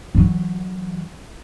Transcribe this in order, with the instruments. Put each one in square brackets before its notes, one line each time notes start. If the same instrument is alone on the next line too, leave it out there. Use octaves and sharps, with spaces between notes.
[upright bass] E3 F#3